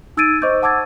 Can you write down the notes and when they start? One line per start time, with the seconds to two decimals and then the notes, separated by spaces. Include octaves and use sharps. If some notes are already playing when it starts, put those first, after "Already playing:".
0.17 D#4 E6 G#6 A6 D7 D#7
0.42 C5 D#5 C#6 D6 G6
0.62 F#5 A5 D6 E6 G#6 A6